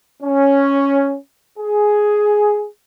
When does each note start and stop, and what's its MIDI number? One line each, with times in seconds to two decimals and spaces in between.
0.23 1.17 61
1.59 2.66 68